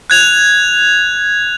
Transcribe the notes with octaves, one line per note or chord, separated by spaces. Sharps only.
F#6 G#6 F7